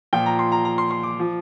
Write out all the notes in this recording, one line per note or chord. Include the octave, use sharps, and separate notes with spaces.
A#2 F3 G5
A#5
C6
A#5
A#5
C6
C6
D6
F3